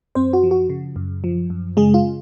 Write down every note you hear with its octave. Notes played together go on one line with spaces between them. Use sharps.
F#2 C4 C5
F#4
F3
F#4
C#3
F#2
F3
F#2
C#3 G#3 G#4
F4